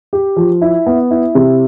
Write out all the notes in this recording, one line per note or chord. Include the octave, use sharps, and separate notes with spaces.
G4
F3
E4
B3
E4
C3